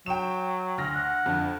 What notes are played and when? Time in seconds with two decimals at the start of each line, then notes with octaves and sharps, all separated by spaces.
0.06 F#3 G5 E7
0.78 D2 F6 A#6
0.94 F#5
1.26 F2 D3